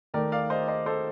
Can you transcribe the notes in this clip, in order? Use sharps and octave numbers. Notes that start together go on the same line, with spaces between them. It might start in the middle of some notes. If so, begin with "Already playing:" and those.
D#2 D#3 A3 A#4 D5
D5 F5
C5 D#5
C5 D#5
A4 C5